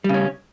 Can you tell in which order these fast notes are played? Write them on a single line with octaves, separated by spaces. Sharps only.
G3 C#3 C#4